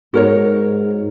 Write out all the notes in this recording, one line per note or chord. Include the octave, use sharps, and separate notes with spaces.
G#2 F#4 A#4 C#5